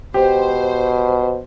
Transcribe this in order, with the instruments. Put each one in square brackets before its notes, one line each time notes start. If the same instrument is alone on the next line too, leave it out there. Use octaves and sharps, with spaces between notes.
[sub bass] E1 [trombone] B2 [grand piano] G4 [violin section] C5